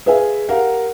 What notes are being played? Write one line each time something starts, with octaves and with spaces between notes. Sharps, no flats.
G#4 B4 E5 F5 G#5
G4 A#4 F5 F#5